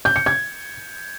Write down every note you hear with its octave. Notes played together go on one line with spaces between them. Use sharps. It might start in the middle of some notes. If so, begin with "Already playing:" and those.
G6
C#7
G#6